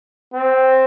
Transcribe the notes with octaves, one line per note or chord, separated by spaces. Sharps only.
C4